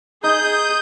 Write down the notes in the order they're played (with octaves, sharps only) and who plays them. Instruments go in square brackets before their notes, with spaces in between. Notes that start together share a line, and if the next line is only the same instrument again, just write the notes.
[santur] D#4 [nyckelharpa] G#4 [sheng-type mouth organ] D#6 [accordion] G6